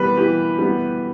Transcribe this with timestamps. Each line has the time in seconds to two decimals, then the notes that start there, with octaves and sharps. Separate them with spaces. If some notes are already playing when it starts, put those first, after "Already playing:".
Already playing: E3 G3 B3 B4
0.17 E3 G4
0.59 G3 B3